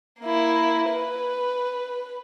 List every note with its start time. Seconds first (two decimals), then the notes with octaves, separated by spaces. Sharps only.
0.21 A#3 E4
0.90 B4